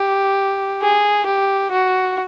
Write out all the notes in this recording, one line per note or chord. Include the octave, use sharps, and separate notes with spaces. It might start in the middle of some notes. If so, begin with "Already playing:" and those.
Already playing: G4
G#4
G4
F#4